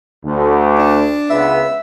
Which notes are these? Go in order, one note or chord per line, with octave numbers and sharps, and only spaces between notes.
D2
D4
C#2 B3 E5